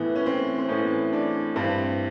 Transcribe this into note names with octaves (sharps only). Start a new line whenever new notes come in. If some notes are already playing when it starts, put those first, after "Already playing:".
Already playing: A2 E3 B3
C#4
C4
C4
A2 E3 C#4
D4
G2 E3 C4